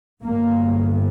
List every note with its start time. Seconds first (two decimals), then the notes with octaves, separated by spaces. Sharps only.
0.23 G1 G2 A#3